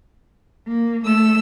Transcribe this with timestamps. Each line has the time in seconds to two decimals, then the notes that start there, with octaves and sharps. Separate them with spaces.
0.66 A#3
1.05 A3 E6